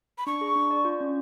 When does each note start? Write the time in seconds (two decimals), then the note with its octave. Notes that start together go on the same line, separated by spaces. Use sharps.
0.18 B5
0.27 D4 C#6
0.41 G#4
0.55 D4
0.71 D5
0.85 F4
1.01 C#4